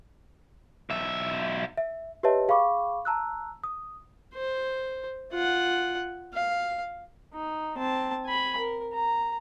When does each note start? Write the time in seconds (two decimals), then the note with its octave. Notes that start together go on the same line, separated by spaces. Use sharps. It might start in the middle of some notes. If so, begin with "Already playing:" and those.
0.90 B1 E5
1.77 E5
2.23 G4 B4 C#5 D#5 E5 A5
2.48 G#4 F5 G5 B5 C#6 D6
3.05 A5 A#5 E6 F#6
3.64 D#6
4.34 C5
5.32 F4 F#5
6.34 F5
7.34 D#4
7.78 C4 A5
8.25 G#5 B5
8.58 A#4
8.93 A#5